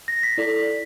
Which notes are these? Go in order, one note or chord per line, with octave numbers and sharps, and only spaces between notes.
A#6
B6
E4 A4 D5